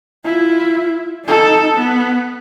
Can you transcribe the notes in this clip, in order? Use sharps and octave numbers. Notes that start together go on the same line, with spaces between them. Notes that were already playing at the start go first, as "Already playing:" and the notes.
E4 F4
D#4 A4
B3